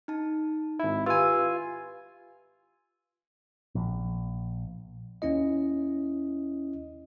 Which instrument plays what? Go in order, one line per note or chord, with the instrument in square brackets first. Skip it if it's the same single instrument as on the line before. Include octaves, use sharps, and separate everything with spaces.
[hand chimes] D#4 A5
[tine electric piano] G#1 E4
[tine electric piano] F4 G#5 [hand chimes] G4 B4 E6
[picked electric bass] A#1
[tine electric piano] D#2 C#4 E4 D#5